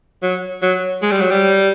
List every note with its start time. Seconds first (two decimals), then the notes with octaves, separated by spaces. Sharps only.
0.23 F#3
0.62 F#3
1.02 G#3
1.12 G3
1.21 F#3
1.31 G3